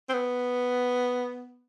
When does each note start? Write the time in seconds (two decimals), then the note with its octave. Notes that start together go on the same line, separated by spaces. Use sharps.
0.09 C4
0.13 B3